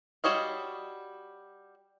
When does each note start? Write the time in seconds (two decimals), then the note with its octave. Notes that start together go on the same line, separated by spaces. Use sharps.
0.24 G3 F#4 C#5 D#5 F5